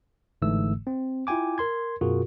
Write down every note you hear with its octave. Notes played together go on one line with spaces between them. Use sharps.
G1 G#2 D3 E3 A3 E6
C4
E4 F4 G5 G#5 D6
A#4 C6 G#6
F#2 B2 F4 F#4 G#4 A#4